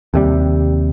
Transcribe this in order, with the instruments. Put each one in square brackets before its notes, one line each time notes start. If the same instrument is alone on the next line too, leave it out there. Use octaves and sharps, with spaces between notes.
[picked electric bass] D#2 C3 G3